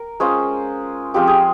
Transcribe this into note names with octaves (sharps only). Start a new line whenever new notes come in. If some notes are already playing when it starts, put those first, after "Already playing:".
Already playing: A#4
G#3 C#4 F4 C5
F3 G#3 C4 F4 G4
G#4